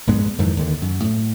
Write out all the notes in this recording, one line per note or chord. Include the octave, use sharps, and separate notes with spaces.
A#1 G2 G#3 B3
F2 G#2 D#3 E3
D#2 D3
F#2
A2